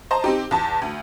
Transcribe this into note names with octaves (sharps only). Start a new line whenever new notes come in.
C5 D#5 A5 A#5
C4 D#4 G4
E2 A5
D2